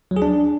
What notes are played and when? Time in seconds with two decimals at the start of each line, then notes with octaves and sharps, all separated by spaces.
0.11 F#3
0.16 G#4
0.22 D4